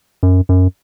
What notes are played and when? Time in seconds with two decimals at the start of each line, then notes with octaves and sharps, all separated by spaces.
0.23 F#2
0.49 F#2